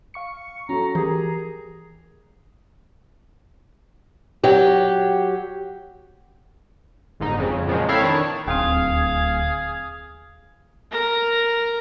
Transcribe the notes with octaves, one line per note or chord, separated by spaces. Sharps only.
F5 C#6 C#7
F#3 C#4 A4 A#5
E3 G4 G#4 A#4 A#5
F#3 G4
G1 G#2 D#4
F2 C#3
A#2 C#3 F3 F#3 G#3
C4 E4 A4 C#5 F5
D#3 D4 C#5
D1 D#2 C4 G#4 F5
A#4 A#5